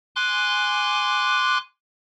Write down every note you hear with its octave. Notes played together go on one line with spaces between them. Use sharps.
G#5 C6 D6 F#6